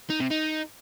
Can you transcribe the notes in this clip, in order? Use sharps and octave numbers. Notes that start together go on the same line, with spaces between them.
D#4
C3
D#4